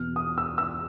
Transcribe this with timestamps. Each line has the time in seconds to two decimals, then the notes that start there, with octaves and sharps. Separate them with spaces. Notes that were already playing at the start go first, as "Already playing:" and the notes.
Already playing: E2 B2 F6
0.16 D#6
0.38 E6
0.58 E6